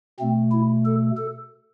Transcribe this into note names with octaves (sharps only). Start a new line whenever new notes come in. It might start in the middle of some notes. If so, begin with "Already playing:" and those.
B2 A3 C4
E4
A4
A4